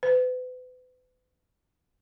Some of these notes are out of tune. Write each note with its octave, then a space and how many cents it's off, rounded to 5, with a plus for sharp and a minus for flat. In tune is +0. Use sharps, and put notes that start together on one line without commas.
B4 +40